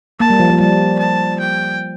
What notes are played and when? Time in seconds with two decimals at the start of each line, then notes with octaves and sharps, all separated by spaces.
0.20 A#3 A5
0.30 G3
0.40 F3
0.50 F3
0.60 G3 A5
0.99 A5
1.40 G5